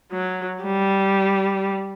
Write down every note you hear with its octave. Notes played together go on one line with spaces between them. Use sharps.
F#3
G3